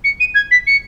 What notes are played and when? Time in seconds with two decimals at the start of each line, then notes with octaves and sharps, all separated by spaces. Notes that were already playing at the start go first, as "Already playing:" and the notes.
0.04 C#7
0.20 D#7
0.35 G#6
0.51 B6
0.67 C#7